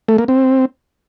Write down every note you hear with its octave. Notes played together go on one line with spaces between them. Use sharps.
A3
A#3
C4